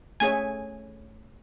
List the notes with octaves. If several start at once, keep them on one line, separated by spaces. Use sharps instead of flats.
A3 C#4 G#4 C#5 E5 G#5